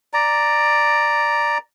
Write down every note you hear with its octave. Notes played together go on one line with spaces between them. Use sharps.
D5 A#5